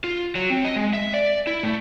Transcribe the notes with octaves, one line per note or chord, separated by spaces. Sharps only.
F4
F#3
C4
D#5
G#3
E5
D5
E4
A3